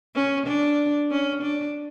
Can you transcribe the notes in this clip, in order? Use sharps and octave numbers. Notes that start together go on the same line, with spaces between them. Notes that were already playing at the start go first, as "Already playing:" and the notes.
C#4
D4
C#4
D4